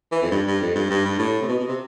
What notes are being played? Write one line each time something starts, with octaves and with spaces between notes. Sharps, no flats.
E3
F2
G2
G2
F2
G2
G2
G2
A2
C3
B2
B2
C3